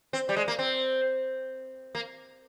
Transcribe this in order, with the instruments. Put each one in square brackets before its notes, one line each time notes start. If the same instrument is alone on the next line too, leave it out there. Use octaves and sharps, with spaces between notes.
[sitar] C4
G3
G#3
A#3
C4
A#3